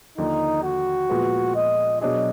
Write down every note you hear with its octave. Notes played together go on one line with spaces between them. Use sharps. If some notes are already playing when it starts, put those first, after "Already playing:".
D#2 D3 F3 D#4
F#4
A#2 F3 G#3 B3
D#5
B2 F#3 D4 G#4 D#5